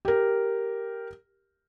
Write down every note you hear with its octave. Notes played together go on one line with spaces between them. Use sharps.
G4 A#4